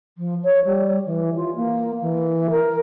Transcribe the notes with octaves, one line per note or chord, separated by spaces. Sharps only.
F3
C#5
G3
E3
F4
A#3
E3
A#4